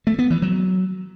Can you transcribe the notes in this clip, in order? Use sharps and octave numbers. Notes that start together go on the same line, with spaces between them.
A3
B3
E3
F#3